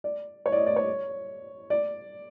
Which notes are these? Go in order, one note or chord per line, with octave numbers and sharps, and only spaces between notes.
D5
C#5
D5
D#5
D5
C#5
D5